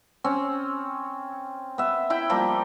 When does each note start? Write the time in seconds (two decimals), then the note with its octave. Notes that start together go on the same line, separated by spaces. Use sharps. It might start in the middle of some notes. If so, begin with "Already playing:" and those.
0.24 C4 C#4
1.78 B3 E5
2.10 E4 G5 B5
2.30 F3 G3 A#3